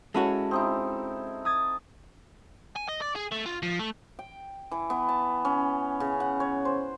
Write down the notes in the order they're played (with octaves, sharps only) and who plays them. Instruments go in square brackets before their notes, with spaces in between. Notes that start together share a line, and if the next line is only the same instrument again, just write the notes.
[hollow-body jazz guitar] G#3 C#4 F#4 [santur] E4 A4
[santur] C4 D#4 E4 [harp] D#6
[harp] D#6 G#6 A6
[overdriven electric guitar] G#5
D#5
D5
G#4
A3
F4
F3
A3
[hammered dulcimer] G5
E3
B3
A5
C#4
C#3
F#5
C#5
C5